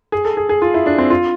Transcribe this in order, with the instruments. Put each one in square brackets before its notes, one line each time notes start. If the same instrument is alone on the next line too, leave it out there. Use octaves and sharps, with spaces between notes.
[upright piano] G#4
A4
G#4
G#4
F4
E4
D4
C4
F4